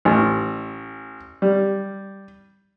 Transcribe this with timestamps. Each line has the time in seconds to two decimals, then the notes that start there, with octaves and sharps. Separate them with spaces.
0.05 A1
1.42 G3